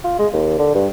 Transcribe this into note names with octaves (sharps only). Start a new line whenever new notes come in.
F4
G#3
D#2
D3
G2